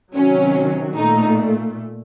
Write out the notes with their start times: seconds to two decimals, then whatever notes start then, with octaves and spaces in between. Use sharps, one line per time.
0.14 C3 D#3 F#3 C#4
0.96 A#2 A3 D#4